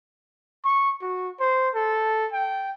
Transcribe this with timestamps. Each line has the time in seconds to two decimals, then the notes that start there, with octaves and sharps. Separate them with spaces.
0.65 C#6
1.02 F#4
1.40 C5
1.74 A4
2.32 G5